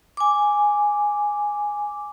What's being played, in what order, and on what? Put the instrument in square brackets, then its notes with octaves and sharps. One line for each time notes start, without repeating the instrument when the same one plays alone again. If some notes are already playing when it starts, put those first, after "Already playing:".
[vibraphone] G#5 D6